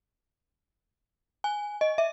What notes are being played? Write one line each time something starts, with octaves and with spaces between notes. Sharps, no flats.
G#5
D#5
E5